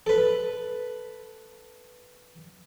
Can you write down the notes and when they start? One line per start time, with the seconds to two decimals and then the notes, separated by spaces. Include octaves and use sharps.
0.06 A4 B4